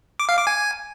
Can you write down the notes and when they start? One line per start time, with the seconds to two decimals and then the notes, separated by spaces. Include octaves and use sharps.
0.20 D6
0.29 F5
0.38 D6
0.47 G#5